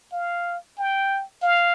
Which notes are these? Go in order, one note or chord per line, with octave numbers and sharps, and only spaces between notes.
F5
G5
F5